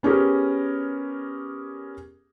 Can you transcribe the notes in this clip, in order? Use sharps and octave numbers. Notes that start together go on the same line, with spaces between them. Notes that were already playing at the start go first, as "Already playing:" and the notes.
B3 C#4 G4 G#4 A#4